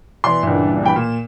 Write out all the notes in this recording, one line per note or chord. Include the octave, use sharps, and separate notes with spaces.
B2 E3 D5 C6
C#2 G2 A#2 E3 D4
E3 G5 B5
A#2 E7